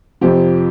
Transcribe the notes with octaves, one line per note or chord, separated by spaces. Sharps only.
F2 C3 F3 G4